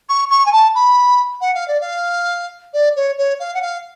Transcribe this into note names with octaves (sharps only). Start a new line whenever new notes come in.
C#6
C#6
G#5
A5
B5
F#5
F5
D5
F5
D5
C#5
C#5
F5
F#5
F5